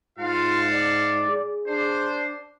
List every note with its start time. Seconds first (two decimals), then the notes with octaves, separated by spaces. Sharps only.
0.19 G#2 F4 F5 F#5 A5
0.72 D5
1.28 G#4
1.67 D4 C5